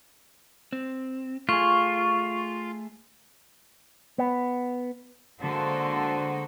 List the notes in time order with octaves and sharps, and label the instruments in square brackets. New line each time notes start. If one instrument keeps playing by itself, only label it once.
[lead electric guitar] C4
[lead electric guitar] A3 G#4 [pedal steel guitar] F4 [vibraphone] C#6
[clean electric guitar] B3
[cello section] D3 G#3 A#3 F#4 A4 C5